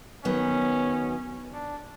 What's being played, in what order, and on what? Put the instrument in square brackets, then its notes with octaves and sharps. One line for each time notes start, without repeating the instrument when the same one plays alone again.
[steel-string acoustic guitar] D#3 F#3 B3 [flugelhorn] C#4
[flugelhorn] D4